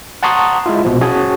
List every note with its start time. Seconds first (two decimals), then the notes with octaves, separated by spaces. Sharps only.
0.23 F#5 A5 A#5 C6 C#6 D#6
0.66 G#3 E4 F4
0.85 A#1 B2 F3
1.01 C#4 F#4 G#4 C#5 G#5 A5